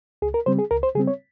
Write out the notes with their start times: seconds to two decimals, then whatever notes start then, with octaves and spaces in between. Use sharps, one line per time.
0.22 C#2 G#4
0.34 A#4
0.46 C#3 G3 C4 C5
0.59 G#4
0.71 C#2 A#4
0.83 C5
0.95 C#3 G3 C4 G#4
1.07 C#5